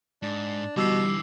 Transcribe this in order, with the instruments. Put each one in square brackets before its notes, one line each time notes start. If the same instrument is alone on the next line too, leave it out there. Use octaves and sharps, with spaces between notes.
[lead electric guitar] G#2 [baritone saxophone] D4
[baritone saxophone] B2 [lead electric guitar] D3 E3 [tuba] G3 [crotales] D6 E6 C7